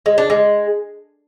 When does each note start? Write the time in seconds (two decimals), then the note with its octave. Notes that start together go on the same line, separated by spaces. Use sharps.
0.06 G#3
0.18 D4
0.30 G#3